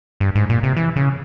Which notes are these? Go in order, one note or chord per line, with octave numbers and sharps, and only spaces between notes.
G2
G#2
A#2
C3
E3
C#3